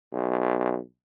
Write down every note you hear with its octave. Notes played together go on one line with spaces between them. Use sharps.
B1